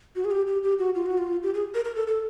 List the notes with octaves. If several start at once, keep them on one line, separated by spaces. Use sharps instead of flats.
F#4
G#4
G4
G4
G4
F#4
F4
F#4
F4
G4
G#4
A#4
A#4
A4
A4